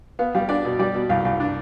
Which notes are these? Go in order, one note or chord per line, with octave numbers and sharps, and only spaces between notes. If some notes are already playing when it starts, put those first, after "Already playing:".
B3 F5
G3 F5
D4 D5
B2
G3 D5
B2
C2 F5
C2 F5
D4